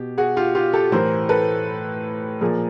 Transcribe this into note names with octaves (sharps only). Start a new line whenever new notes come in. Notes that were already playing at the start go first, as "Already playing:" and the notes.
Already playing: B2 G4
F#4 G#4
F4 G4
F4 G4
G4 A4
A2 E3 A#4 C5
A4 B4
A#2 F3 G#4 A#4